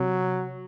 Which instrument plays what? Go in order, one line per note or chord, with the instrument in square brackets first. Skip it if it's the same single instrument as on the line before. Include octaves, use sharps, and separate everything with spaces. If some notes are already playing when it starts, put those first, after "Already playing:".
Already playing: [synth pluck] C3 [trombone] F#3